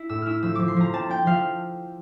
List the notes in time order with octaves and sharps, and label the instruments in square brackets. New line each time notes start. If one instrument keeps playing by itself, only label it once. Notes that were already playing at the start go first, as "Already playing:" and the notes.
Already playing: [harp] E4
A2 E6
E4 E6 F6
F3 E6
F3 D6
C6
F3 A#5
C4 A5
C4 G5
F3 F5